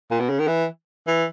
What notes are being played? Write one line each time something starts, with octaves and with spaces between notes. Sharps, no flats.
A#2
B2
C#3
D#3
E3
E3